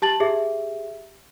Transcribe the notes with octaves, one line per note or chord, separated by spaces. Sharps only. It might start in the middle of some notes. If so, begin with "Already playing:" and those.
G4 A5 A6 F#7
G4 G#4 E5